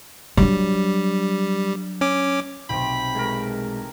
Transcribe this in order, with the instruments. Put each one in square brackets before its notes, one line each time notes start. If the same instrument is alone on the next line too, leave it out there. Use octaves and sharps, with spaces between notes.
[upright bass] F#3 D4 [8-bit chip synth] G3
[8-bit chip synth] C#4 D6
[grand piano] B1 C3 [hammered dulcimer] C4 G4 [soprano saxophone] B5
[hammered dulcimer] E3 A3 A#4 [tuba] G#3